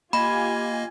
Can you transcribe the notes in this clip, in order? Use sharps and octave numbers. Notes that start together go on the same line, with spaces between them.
A#3 F4 G4 D#5 G#5 B5